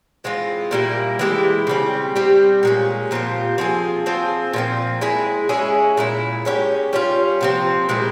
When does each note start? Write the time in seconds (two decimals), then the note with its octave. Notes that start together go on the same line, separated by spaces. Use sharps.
0.24 E3 G#3 C4 F4
0.71 A#2 G3 A#3 E4
1.19 E3 G#3 E4 G4
1.67 C#3 G3 C4
2.15 G3 C4 G4
2.63 A#2 G#3 C#4
3.11 A#2 F3 C4 G4
3.58 F3 C4 F4 G#4
4.06 F3 C4 F4 G#4
4.53 A#2 F3 C4
5.01 G#3 E4 G#4
5.49 G#3 C#4 E4 G#4
5.97 A#2 G#3 E4
6.45 G#3 C#4 E4 G4
6.93 G3 C#4 F4
7.41 C3 F3 C4
7.89 A#2 G#3 E4 G4